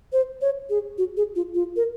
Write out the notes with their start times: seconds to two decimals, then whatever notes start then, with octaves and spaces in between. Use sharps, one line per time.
0.13 C5
0.41 C#5
0.70 G#4
0.98 F#4
1.17 G#4
1.36 F4
1.55 F4
1.76 A#4